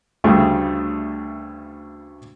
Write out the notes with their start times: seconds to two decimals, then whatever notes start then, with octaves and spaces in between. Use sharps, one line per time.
0.24 D2 G2 C#3 A3